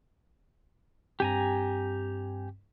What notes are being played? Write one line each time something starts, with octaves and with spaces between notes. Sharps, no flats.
G2 C4 G4 G#5 A#5